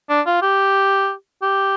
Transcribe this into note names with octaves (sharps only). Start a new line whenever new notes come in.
D4
F4
G4
G4